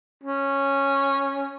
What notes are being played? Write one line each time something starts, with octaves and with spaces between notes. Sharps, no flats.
C#4